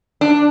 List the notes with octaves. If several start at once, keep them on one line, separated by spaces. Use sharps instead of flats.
D4